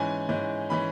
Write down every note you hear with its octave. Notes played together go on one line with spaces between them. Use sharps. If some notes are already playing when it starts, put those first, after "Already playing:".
Already playing: G#2 E3 C#4 G#5
G#2 E3 C#4
E3 C#4 B5